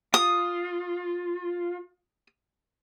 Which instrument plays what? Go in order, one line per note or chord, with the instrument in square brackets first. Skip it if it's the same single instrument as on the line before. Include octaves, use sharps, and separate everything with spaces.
[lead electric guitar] F4 [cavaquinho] D#6